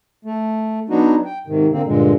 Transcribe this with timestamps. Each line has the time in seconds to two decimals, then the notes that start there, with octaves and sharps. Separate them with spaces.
0.25 A3
0.90 F#3 B3 D4 D#4 F#4
1.25 G5
1.47 G#2 C3 D#3
1.72 D3 A#3 C4
1.86 G2 A#2 D3 G#3